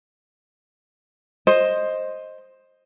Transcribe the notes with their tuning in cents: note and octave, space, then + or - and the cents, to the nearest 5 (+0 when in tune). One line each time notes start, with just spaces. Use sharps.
C5 +10 D#5 +0